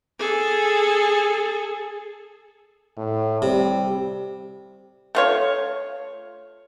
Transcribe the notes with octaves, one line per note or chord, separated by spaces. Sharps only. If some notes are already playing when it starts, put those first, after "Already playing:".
G#4 A4
A2
C3 G3
A3 F4 C#5